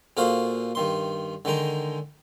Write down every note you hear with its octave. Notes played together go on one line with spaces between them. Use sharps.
A#2 F#4 G#4 A4 C5 F5
G2 D#3 C6
D3 D#3 G#3 G5 A#5